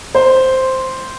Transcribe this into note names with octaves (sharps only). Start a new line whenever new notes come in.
C5